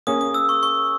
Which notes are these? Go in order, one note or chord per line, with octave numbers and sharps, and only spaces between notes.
A#3 C#4 G#4 C#5 D#6
D#6
E6
C#6
C#6